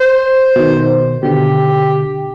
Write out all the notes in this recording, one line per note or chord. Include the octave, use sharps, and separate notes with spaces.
C5
B2 D#3
B2 D3 G4